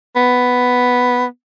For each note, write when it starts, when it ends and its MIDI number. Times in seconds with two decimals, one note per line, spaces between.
0.16 1.25 59